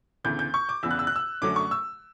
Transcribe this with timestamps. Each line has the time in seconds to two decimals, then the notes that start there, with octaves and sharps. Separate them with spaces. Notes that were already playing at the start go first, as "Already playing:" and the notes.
0.24 D2 C#3 E3 B3 G6
0.39 G6
0.54 C#6
0.69 D6
0.83 E2 C#3 E3 B3 E6
0.91 F#6
0.99 E6
1.07 F#6
1.16 E6
1.42 F#2 D3 F#3 A3 C#4 D6
1.56 C#6
1.71 E6